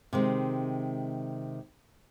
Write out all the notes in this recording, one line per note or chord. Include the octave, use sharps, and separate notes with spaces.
C3 D#3 G#3